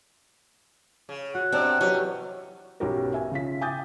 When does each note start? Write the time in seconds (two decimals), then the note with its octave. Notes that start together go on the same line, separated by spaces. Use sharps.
1.09 C#3
1.35 F#4 F#5
1.52 C3 C4 D4 D#4 D5
1.81 E3 F#3 C#4 F#4 G4
2.80 B1 B3 C#4 F#4 G4 A#4
3.14 E5 G#5
3.32 C#3 F4 B6
3.61 G5 G#5 D6 D#6 G6 A6